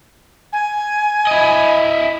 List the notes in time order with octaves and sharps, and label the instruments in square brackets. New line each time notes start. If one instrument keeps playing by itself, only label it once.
[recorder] G#5
[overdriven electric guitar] E4 D#5